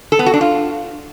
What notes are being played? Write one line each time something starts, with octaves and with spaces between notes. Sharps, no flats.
A4
B3
F#4
D4
F4